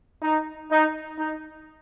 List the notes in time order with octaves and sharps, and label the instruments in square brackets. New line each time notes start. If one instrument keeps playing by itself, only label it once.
[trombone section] D#4
D#4
D#4